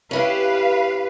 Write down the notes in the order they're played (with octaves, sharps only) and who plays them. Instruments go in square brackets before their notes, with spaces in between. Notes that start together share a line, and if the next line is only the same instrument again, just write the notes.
[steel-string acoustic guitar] C#4 E4 G4 [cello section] B4 F5